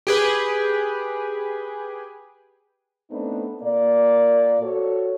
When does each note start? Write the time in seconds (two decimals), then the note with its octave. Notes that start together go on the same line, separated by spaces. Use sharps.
0.07 G4 G#4 B4
3.10 A3 B3 C4 D4 D#4
3.62 A#2 A#3 D5
4.61 F#4 A4 C5 C#5